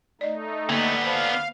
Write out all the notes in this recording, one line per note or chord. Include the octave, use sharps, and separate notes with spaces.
A3 D#4 D5 D#5
D3 A#3 B3
C5 F5 A5 B5